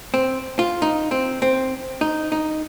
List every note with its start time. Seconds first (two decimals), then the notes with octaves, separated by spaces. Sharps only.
0.14 C4
0.59 F4
0.82 D#4
1.11 C4
1.42 C4
2.01 D#4
2.32 D#4